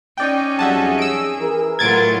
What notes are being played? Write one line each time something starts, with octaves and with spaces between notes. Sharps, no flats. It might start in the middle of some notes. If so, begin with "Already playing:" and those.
C#4 D#4 D5 G5
F2 F#3 G3 G#4 E5 F#5 A5
E6 D7
E3 A#4
A2 F#3 F4 G#6 A6 D7